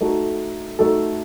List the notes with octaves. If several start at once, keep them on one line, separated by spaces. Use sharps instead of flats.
A3 D#4 F#4 A4
A3 D#4 F#4 A4